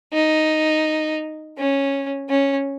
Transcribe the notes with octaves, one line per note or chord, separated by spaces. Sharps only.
D#4
C#4
C#4